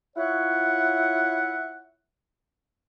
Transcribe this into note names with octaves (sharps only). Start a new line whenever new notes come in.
E4 F4 C#5 E5 F#5